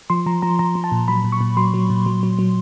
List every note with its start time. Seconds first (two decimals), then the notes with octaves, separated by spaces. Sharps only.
0.10 F3 C6
0.26 F3 A#5
0.42 F3 A#5
0.59 F3 A#5
0.75 F3
0.84 A5
0.92 A#2
1.08 F#3 B5
1.24 A#2
1.32 C#6
1.41 A#2
1.57 F#3 C6
1.74 F#3
1.90 A#2
2.06 F#3
2.23 F#3
2.39 F#3